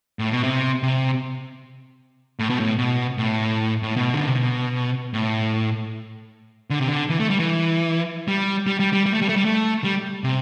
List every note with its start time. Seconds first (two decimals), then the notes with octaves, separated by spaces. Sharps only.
0.19 A2
0.31 B2
0.43 C3
0.83 C3
2.39 A2
2.50 B2
2.60 A2
2.79 B2
3.18 A2
3.83 A2
3.97 B2
4.14 D3
4.25 C3
4.35 B2
5.14 A2
6.70 D3
6.79 C3
6.88 D3
7.10 E3
7.20 A3
7.30 G3
7.39 E3
8.28 G3
8.67 G3
8.80 G3
8.93 G3
9.06 G3
9.14 A3
9.22 G3
9.29 A3
9.36 G3
9.45 A3
9.84 G3
10.24 C3